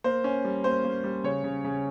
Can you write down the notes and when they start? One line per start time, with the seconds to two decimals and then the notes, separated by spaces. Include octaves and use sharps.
0.04 A#3 C5
0.24 C#4
0.45 G3
0.64 A#3 C5
0.84 A#3
1.04 G3
1.24 C#3 C#5
1.44 C#3
1.64 C#3